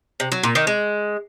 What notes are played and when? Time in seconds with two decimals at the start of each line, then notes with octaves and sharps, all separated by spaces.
0.20 C3
0.32 F#3
0.43 A#2
0.55 D#3
0.67 G#3